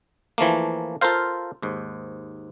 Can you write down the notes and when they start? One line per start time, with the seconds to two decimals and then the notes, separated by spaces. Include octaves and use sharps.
0.38 E3 F3 A3 A#3
1.01 F4 A4 A#4 C5 F5
1.62 D#2 G#2